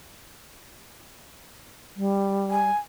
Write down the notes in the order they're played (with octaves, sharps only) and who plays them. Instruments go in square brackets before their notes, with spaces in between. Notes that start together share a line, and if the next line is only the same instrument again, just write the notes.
[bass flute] G3
[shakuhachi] G#5